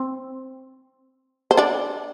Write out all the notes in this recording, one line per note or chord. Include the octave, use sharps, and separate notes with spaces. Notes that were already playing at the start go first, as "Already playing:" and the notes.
Already playing: C4
C5
D4 D5